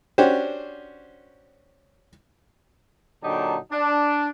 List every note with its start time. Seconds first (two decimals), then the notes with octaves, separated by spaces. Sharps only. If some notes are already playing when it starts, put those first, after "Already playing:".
0.18 C#4 D4 F#4 G4 C5
3.23 A#2 D3 F#3 D#4 G4 A5
3.71 D4